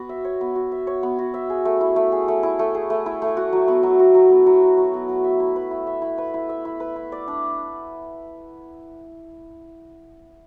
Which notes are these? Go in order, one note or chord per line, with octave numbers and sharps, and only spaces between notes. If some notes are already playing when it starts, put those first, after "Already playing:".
Already playing: B3 F#4
E5
C#5
B3
F#4
E5
C#5
B3
F#4
E5
G#4
A3
E4
A3
G#4
A3
E4
A3
G#4
A3
E4
A3
F#4
F#3
B3
F#3
F#4
F#3
B3
F#3
F#4
F#3
B3
F#3
E5
E4
B4
E4
E5
E4
B4
E4
E5
E4
B4
E4
D5
D4